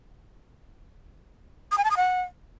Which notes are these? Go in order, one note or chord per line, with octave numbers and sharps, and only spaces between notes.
D#6
G#5
A5
D#6
F#5